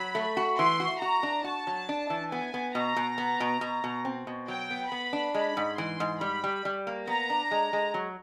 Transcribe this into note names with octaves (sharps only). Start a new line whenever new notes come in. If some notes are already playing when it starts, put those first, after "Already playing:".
Already playing: F#3 B5
A3
F#4
E3 C6
F#4
F#4 A#5
D4
F#4 A5
F#3
D4
E3
B3 G#5
B3
B2 A#5
B2
B3
B2
B2
B2
C4
B2
F#3 G5
B3
B3 B5
D4
G#3 B5
G#2
E3 C6
G#2
G3 B5
G3
G3
A#3
B3 A#5
D4
G#3
G#3
F#3